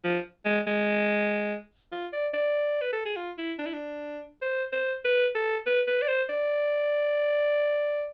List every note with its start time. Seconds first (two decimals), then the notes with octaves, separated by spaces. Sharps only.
0.04 F3
0.45 G#3
0.67 G#3
1.92 F4
2.13 D5
2.34 D5
2.81 B4
2.93 A4
3.05 G#4
3.16 F4
3.38 E4
3.59 D4
3.66 E4
3.73 D4
4.42 C5
4.72 C5
5.04 B4
5.35 A4
5.66 B4
5.88 B4
6.02 D5
6.08 C5
6.29 D5